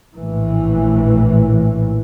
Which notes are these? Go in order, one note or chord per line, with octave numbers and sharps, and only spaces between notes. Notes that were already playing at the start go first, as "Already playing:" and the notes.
A#1 A2 E3